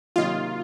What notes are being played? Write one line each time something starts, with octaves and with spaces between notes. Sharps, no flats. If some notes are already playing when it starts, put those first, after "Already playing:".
C3 D#3 F#3 A#3 D#4 F4